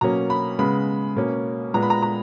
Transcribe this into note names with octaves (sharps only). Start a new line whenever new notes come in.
B2 F#3 A#3 C#4 A#5
B5
C#3 G#3 B3 B5
B2 A#3 C#4
A#2 G#3 B3 A#5
B5
A#5
A#5